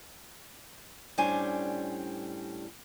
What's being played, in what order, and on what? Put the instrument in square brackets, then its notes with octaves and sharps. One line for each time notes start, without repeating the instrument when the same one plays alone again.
[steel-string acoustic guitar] A2 G3 C#4 D4 C5 G#5